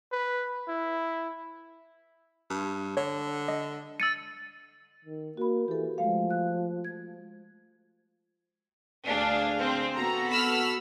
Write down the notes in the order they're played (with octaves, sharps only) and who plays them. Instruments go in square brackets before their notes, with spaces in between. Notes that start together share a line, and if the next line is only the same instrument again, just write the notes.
[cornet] B4
E4
[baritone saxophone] G2
[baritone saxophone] D3 [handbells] C#5
[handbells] D#5
[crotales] E6 A6 D#7 [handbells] C#7
[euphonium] D#3
[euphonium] A#3 [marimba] F#4 B5
[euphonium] E3 [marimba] G4 A4
[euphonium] F3 [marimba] G#3 A3 F5
[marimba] F#6
G#6
[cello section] D2 G#4 F5 [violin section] D4
[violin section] C4
[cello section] B3 F#4 A4 [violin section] A#5
[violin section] B5 E6 F6